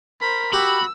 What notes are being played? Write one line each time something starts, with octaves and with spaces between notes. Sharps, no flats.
A#4 C5 B5
F#4 G4 B5 E6